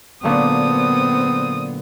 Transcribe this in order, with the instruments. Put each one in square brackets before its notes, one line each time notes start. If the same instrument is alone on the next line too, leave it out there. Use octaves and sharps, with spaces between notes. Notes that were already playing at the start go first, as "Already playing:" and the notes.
[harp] A#2 D3 F#3 [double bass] B3 C4 [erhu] D#6